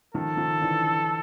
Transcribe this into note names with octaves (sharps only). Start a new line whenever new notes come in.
D#3 F3 A4
D#3 F3
D3 E3